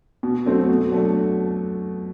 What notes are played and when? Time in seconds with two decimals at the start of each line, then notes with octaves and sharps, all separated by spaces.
0.23 B2
0.46 F#3 A3 C4 F#4
0.69 B2
0.92 F#3 A3 D4